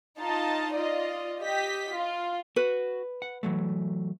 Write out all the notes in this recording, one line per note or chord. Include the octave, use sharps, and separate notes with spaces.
D#4 F4 D#5 A5
F4 D5 D#5
G4 D#5 B6
F4
F#4 B4
F#5
E3 F#3 A3